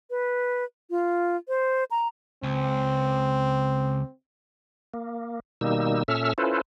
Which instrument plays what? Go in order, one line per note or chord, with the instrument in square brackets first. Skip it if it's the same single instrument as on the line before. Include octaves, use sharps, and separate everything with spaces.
[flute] B4
F4
C5
A#5
[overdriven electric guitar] C#2 [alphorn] C4
[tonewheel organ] A#3
B2 D#3 G3 A#3 D#4 E6
A#2 C#4 A4 E5 E6 F6
C#4 E4 F4 A4 B4 C5